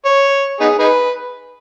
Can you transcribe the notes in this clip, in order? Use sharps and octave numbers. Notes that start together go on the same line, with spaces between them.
C#5
B3 D#4 G#4
D#4 G#4 B4